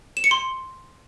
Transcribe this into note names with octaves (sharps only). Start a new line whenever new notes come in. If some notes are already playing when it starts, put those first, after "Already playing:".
E7
C#7
C6